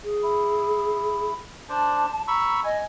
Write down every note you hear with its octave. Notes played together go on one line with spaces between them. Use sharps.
G#4
E4
D4 C5 D5 A5
A#5 B5 C#6 E6
D#5 G#5